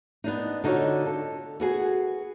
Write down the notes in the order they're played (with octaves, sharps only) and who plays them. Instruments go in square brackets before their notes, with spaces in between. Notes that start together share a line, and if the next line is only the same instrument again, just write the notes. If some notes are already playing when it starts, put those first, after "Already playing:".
[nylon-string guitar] B3 D4 D#4
D3 D#4 F4 F#4 C#5
A4
B3 F#4 G#4 G#5